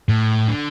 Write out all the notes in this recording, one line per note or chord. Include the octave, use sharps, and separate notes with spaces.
A2
D3